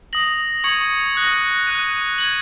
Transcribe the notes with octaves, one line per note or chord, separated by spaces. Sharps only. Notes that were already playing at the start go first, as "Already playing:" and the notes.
D#6 A#6 F#7
C#6 G#6 C#7 F#7
D#6 F#6 A#6
F#6 A#6 D#7
G#6 F#7